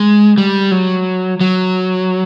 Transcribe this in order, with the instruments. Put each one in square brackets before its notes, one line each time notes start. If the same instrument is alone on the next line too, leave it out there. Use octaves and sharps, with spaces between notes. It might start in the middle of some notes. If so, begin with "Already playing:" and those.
Already playing: [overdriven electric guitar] G#3
G3
F#3
F#3